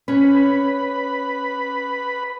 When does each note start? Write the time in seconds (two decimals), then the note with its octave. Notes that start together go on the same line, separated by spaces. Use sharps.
0.08 C#4 B4 B5